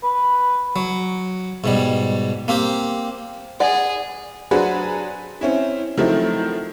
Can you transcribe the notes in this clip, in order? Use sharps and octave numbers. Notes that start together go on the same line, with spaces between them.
B4
F#3
G#2 B2 G3
A#3 C4 G4
G#4 D5 F#5 G#5
F#3 D4 F#4 G#4 B4 C5
C4 C#4 E4
D#3 F3 F#3 A3 C4 E4